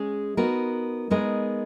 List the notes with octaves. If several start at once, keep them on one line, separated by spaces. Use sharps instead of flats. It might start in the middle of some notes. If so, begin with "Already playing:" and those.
Already playing: G#3 C#4 G#4
B3 D#4 F#4 A#4
G#3 B3 D#4 A#4 D#5